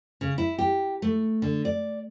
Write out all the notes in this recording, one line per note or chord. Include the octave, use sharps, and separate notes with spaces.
C#3
E4
G4
A3
D3
D5